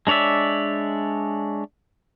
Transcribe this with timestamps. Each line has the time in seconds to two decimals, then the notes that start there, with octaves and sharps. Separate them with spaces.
0.07 G#3 D4 C#5 D5 E5